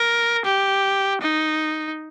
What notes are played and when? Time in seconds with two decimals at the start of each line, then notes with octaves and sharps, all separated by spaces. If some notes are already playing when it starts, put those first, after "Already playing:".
Already playing: A#4
0.45 G4
1.21 D#4